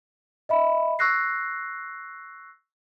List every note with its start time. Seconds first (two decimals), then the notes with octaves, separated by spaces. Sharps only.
0.49 D#5 E5 B5
0.99 C#6 E6 F#6 A#6 C7